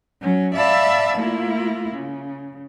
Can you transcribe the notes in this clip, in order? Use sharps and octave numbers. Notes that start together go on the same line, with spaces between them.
F#3 C#4
D5 E5 F5 A5 B5 E6
A3 A#3 E4 F4
C#3